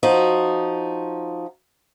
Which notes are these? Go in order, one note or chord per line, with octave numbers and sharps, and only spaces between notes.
F3 D#4 F#4